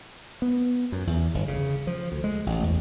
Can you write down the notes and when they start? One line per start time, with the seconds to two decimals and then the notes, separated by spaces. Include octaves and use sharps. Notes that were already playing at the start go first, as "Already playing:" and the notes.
0.42 B3
0.92 F#2
1.07 E2
1.34 G1
1.48 C#3
1.87 F3
2.12 D2
2.24 G#3
2.46 A1
2.63 E2